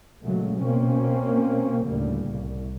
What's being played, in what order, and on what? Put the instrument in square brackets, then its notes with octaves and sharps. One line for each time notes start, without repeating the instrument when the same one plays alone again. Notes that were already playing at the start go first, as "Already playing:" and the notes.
[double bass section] A#2 C#3 F#3 G#3 A3
B2 A#3 C4 C#4
D2 A2 C#3 G3 A#3
C2